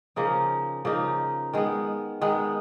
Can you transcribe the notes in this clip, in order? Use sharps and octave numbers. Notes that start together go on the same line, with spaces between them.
C#3 F3 A#3 D#4
C#3 F3 A#3 D#4
D#3 G#3 B3
D#3 G#3 B3